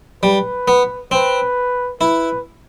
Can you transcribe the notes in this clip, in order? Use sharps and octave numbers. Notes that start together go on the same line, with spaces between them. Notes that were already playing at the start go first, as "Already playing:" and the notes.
G3 B4
B3
C4 B4
E4 B4